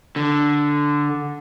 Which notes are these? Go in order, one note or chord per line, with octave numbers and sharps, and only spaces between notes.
D3